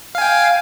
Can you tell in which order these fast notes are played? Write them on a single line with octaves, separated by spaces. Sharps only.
F5 G#5 G5